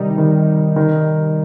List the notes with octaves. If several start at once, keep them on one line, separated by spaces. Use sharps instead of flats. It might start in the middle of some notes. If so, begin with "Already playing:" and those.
Already playing: C3 D#3 G3 D#4
D#3
D#3